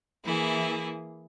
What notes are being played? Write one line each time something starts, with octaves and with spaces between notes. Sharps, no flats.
E3 A#3 E4 G#4